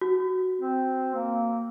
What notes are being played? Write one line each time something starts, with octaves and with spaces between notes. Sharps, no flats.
F#4
C4
A#3